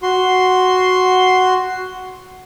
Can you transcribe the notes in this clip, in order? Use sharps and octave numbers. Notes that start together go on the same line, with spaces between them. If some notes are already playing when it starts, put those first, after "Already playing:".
F#4 C6